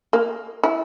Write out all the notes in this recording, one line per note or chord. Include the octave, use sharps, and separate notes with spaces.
A#3
E4